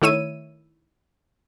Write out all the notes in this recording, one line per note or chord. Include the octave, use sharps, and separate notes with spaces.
D#3 A3 E4 C#5 E6 D#7